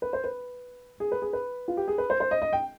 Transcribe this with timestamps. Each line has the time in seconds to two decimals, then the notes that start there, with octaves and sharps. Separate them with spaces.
0.02 B4
0.13 C5
0.24 B4
1.00 G#4
1.12 B4
1.22 G#4
1.33 B4
1.68 F4
1.77 G4
1.88 G#4
1.98 B4
2.10 C5
2.20 C5
2.31 D#5
2.42 D#5
2.53 G5